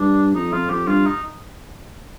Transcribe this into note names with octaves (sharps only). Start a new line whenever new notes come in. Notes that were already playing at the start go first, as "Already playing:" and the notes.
Already playing: G2 D4
F2 D#4
F2 F4
F2 G4
G2 F4
D#4